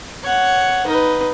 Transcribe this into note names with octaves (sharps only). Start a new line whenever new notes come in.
C#5 F#5
D#4 B4